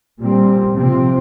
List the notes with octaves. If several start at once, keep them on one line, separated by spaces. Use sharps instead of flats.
A#2 G3 C4
C3 F3 C4